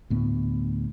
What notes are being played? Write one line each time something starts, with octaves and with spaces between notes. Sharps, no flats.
D2 A2 B3